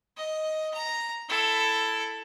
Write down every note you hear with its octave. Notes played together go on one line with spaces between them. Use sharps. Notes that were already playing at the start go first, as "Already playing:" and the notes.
D#5
A#5
E4 A4